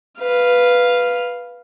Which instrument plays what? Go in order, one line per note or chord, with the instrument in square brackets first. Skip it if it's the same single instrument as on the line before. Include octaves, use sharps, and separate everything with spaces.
[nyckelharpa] B4 F5